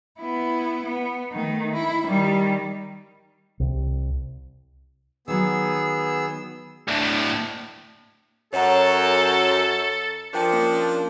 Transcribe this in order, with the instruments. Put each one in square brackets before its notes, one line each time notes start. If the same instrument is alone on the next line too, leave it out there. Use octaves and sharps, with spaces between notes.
[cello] B3 E4
B3
D#3 A3
E4
D#3 G3
[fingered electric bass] C2
[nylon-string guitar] D#3 F#3 [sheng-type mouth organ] B3 G#4 E6
[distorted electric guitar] D2 A2
[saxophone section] F#2 [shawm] A4 [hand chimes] C#5 F#5 A#5
[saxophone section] F3 D4 [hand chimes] A#4 G5 C#7
[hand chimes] A#3 C#4 A#4